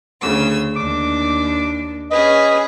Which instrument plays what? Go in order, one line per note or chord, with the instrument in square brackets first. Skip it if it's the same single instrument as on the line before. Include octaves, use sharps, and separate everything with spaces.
[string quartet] D2 C#3 E6
[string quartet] D#2 D4 [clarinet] D6
[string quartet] C#4 G#4 B4 [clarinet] D#5